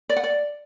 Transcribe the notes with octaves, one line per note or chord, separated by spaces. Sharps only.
D5
F#5
D5